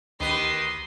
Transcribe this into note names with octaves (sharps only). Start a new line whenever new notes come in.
D2 D#3 G4 B4 C6 D#6